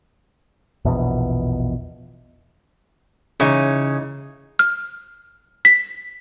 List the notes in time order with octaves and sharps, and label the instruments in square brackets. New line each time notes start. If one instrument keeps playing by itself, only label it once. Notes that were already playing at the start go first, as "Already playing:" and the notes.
[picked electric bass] A#1 E2 B2
[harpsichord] C#3 [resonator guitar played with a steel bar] E3 D#4 C#5
[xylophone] F6
B6